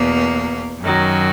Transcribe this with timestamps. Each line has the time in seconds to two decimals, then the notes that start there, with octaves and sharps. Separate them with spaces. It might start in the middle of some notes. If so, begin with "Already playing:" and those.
Already playing: E2 B2 A#3
0.80 F#2 D#3 F#3